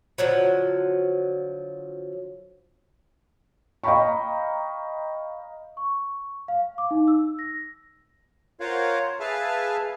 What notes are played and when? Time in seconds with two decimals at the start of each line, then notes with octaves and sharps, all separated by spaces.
0.18 D3 F3 F#3
3.84 D#5 F5 G5 A#5 B5 C#6
5.77 C#6
6.48 F5
6.78 D6
6.91 D#4
7.08 E6
7.39 A#6
8.60 F4 A#4 C5 C#5 F5 F#5
9.20 G#4 B4 E5 F5 A5 F6